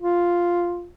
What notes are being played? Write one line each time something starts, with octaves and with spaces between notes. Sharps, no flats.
F4